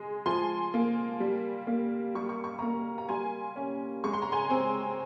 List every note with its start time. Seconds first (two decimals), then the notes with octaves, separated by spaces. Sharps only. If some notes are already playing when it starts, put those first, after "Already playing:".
Already playing: G#3 G#5
0.26 F3 G#5 C6
0.74 A#3
1.20 G3
1.67 A#3
2.15 G3 C#6
2.29 C#6
2.44 C#6
2.59 A#3 A#5 C#6
2.98 A#5
3.09 G3 G#5 C6
3.56 C#4
4.04 G#3 C#6
4.13 C6
4.22 A#5
4.32 G#5 C6
4.50 C4